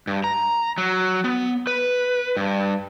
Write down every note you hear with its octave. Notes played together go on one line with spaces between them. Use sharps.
G2
A#5
F#3
B3
B4
G2